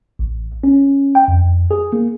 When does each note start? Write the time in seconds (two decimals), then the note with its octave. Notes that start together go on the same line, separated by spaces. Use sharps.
0.19 A1
0.64 C#4
1.15 G5
1.28 F2
1.71 G#4
1.93 A#3